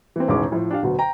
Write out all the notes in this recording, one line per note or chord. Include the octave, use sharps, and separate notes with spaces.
E3 A#3 C4
E1 A1 D#3 G#3 C#4 D6
A2 F3
D4 G4 F5
D2 B2 F#3
G5 A#5